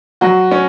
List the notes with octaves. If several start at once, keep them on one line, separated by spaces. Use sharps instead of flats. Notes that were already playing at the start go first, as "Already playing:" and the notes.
F#3 F#4
C#4